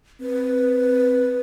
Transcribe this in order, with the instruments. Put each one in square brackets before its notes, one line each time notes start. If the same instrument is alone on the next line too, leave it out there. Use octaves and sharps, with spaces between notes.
[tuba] C4 [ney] B4